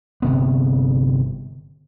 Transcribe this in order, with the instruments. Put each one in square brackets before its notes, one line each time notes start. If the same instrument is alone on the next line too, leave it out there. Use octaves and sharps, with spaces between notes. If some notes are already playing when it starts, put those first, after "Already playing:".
[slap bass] G1 C3 B3